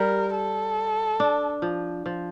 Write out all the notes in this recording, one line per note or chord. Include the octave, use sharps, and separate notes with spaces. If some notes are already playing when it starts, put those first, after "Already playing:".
Already playing: G3 A#4
A4
D4
F3
F3